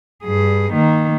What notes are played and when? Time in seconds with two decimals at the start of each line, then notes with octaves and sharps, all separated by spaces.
0.23 G2 G#4
0.72 D#3 A#3